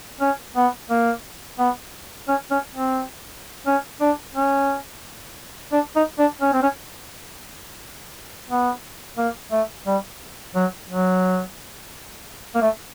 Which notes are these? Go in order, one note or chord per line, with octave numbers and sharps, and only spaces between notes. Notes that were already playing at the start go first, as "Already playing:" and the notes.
C#4
B3
A#3
B3
C#4
C#4
C4
C#4
D4
C#4
D4
D#4
D4
C#4
C4
C#4
B3
A#3
A3
G3
F#3
F#3
A#3
A3